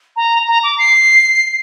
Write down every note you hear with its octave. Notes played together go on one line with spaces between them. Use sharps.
A#5
A#5
D6
C7